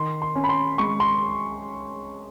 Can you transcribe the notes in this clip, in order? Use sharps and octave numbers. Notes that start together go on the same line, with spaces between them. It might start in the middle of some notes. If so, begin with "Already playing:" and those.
Already playing: D#3 C6
C6
C#4
B5
C6
G#3 C#6
C6